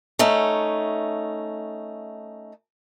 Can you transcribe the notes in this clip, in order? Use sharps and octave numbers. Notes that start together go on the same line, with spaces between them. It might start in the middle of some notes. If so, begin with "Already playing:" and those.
A3 C#4 D#4